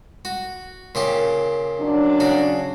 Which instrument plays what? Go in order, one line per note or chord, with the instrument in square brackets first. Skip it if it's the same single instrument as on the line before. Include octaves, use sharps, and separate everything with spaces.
[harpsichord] F#4
A#2 C#3 G4
[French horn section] F#3 C#4 D4
[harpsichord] C#3 F#4